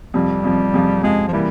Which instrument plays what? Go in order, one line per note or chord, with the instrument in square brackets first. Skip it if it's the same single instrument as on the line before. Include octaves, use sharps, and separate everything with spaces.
[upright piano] F2 C3 F3 [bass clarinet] G3
[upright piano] F2 C3 F3
F2 C3 F3
[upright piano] F2 C3 F3 [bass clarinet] G#3
[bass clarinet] F3
[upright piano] C3 E3 A#3 E4 [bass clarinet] G3